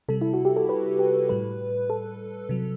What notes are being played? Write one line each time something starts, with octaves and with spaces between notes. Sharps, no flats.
C3 G3 A4
E4
F#4
G4
A4
B4
G4
A2 G3 B4
A4
C3 F#3